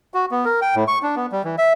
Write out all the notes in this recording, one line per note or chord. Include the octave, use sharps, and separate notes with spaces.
F#4
B3
A#4
G5
A2
C#6
D4
B3
G3
E3
E5